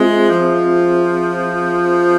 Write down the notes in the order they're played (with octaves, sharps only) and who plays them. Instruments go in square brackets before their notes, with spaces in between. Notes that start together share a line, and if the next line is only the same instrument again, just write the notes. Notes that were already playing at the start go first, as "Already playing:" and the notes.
Already playing: [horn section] G#3 [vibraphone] C4 F4 G#4 C5 E5
[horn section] F3